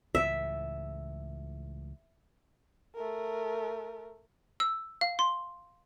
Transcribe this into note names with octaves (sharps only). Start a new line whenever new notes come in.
C#2 A2 E3 E5
A3 A#4
E6
F5
C6